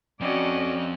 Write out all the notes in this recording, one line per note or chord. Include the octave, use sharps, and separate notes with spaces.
F2 C#4 F#4 D5 D#5